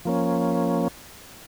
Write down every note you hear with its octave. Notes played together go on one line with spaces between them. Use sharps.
F3 A#3 C#4